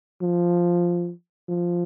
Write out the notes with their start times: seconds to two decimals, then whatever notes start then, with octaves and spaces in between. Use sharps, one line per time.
0.22 F3
1.49 F3